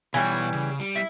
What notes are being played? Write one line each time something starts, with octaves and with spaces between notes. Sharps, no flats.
B2 E3 G3 C#5
C#3
G3
E4